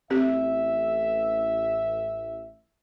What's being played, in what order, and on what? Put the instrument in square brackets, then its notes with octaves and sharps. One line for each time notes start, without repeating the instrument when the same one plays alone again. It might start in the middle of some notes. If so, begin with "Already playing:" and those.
[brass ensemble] A1 E5 [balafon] C4 G4